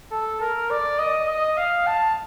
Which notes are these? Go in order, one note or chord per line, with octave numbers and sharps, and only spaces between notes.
A4
A#4
D5
D#5
D#5
F5
A5